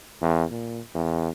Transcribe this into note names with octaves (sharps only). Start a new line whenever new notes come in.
E2
A#2
E2